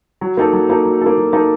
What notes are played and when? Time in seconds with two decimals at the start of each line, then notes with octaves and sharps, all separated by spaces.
0.21 F#3
0.37 A#3 D#4 A4
0.53 F#3
0.69 A#3 D#4 A4
0.85 F#3
1.01 A#3 D#4 A4
1.18 F#3
1.33 A#3 D#4 A4